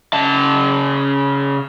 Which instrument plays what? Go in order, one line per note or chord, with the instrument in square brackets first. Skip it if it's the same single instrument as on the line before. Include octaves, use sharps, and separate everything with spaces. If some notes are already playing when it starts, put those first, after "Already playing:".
[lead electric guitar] C#3 A5